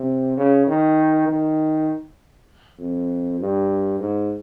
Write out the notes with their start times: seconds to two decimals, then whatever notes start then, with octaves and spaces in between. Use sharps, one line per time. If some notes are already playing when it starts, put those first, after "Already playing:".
Already playing: C3
0.37 C#3
0.67 D#3
1.28 D#3
2.79 F2
3.40 G2
4.00 G#2